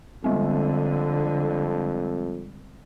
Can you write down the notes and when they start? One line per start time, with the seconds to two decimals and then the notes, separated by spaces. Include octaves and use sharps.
0.24 F2 D3 G3 G#3 C4